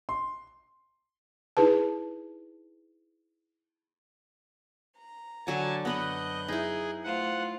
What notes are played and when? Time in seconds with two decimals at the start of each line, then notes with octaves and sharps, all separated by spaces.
0.09 C6
1.57 D#4 E4 G#4 B4 A5
4.97 A#5
5.47 D3 F#3 F#5 G#5 A5
5.85 F#2 B3 B4 D#5 F#5 F#6 G6
6.48 D#4 E4 G#4
7.04 A3 F4 C5 F#5